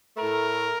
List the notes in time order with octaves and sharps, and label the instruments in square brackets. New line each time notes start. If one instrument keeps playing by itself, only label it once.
[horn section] A2 A3 A#4